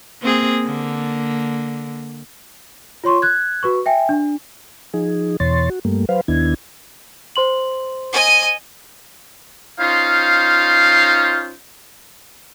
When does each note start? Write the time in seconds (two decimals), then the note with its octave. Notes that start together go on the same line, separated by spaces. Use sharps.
0.21 A#3 C4 G#4
0.64 D3 A#3
3.04 F4 C#5 C6 C#6
3.22 F#6 G#6
3.63 F#4 B4 C#6
3.86 E5 G5 G#5
4.09 D4
4.94 F3 D#4 G#4
5.40 E2 B2 E3 C#5 C6 A6
5.70 F#4
5.85 G2 G3 A3 A#3
6.09 F#3 B4 C5 F5
6.28 D#2 D#3 B3 D4 E4 G#6
7.36 C5 C6 F#7
8.12 D#5 G#5
9.80 C#4 D#4 F4 C5 F5